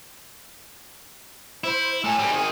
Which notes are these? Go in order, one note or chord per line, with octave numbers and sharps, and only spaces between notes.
E4 C5
A2 A4 G#5
G3 C4
D#3 G#4